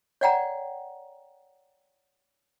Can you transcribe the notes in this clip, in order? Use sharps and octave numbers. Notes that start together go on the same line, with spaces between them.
C#5 D5 F#5 G5 A#5